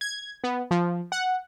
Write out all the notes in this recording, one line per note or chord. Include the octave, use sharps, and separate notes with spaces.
G#6
B3
F3
F#5